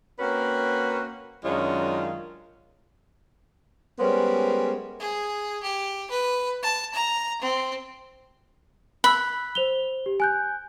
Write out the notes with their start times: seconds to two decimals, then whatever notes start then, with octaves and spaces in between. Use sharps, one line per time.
0.19 A#3 C4 C#4 F#4 A#4 B4
1.45 F#2 D#3 G#3 C#4 D4 F4
3.99 G3 G#3 B3 C#4 A#4 C5
5.00 G#4
5.63 G4
6.11 B4
6.63 A5
6.94 A#5
7.42 C4
9.04 B5 E6 F#6
9.55 C5 F7 G7
10.06 G4
10.20 G#5 F#6 G6